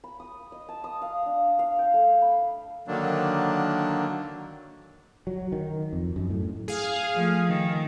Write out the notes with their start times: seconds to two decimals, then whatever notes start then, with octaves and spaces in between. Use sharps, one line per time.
0.04 B5
0.20 D#6
0.52 D#5
0.69 A5
0.84 D#6
1.02 F5
1.26 D4
1.59 F5
1.79 G5
1.94 A3
2.22 B5
2.88 D3 D#3 F#3 A#3 D4
5.27 F#3
5.52 D#3
5.93 F2
6.16 F#2
6.30 A2
6.68 G#4 F5
7.14 F3 A3
7.48 D#3